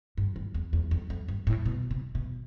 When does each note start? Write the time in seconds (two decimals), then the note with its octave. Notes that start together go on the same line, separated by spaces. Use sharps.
0.18 G2
0.36 G2
0.54 E2
0.73 E2
0.91 F2
1.10 F2
1.28 G2
1.47 A2
1.66 B2
1.91 C3
2.15 B2